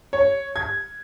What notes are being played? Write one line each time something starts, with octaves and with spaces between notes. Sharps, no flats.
C#5
G#6